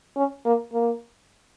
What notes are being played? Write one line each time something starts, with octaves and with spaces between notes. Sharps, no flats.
C#4
A#3
A#3